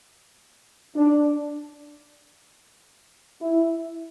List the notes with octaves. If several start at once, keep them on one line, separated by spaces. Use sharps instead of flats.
D4
E4